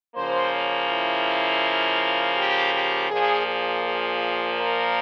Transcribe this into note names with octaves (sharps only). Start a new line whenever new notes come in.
C#3 F3 A#3 C5
C#5
E4
G4
G4
A#2 F3 A#3 G#4
G#4
G#4
A#4